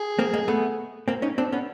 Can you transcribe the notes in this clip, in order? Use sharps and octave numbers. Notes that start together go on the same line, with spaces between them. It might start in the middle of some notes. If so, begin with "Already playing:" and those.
Already playing: G#4
A#3 C4
G#3 A#3
A3 B3
A#3 C4
C#4 D#4
C4 D4
B3 C#4